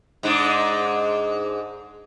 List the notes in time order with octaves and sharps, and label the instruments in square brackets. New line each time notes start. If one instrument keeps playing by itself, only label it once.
[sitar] G#2 G#3 D4